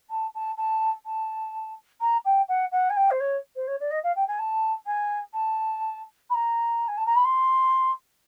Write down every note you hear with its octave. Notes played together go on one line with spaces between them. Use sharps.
A5
A5
A5
A5
A#5
G5
F#5
F#5
G#5
G5
C5
C#5
C5
C#5
D5
D#5
F5
G5
G#5
A5
G#5
A5
B5
A#5
G#5
A5
A#5
B5
C6